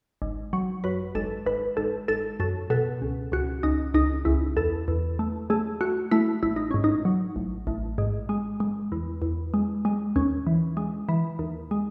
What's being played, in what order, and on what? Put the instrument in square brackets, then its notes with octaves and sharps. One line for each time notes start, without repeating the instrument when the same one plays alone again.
[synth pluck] G#1
F#3
F#2 B4
G#1 A4
G#1 B4
G#1 A4
G#1 A4
F#2 A4
B2 A4
C#2
C#2 F#4
C#2 D#4
C#2 D#4
C#2 E4
E2 A4
E2
A3
A3 G#4
A3 F#4
A3 E4
A1 E4
D#4
G#2 C#4
D#4
F#3
A1
A1
G#2
G#3
G#3
E2
E2
G#3
G#3
D#2 C#4
E3
G#3
E3
D#2
G#3